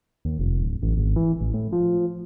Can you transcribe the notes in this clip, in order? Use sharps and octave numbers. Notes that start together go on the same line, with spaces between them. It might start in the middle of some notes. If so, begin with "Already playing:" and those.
D#2
F1
D1
A1
G#1
E3
A1
A2
F3